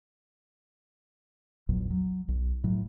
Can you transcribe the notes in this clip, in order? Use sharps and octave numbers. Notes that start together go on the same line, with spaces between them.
A#1 E2 A#2 F#3
F#3
B1
A2 F#3